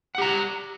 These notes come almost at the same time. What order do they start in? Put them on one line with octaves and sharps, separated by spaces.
F#5 G4 A#5